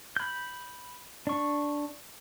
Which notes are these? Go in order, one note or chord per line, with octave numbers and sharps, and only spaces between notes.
B5 G6
D4 C#6